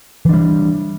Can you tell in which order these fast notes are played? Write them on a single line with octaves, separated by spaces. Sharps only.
E3 D4 G3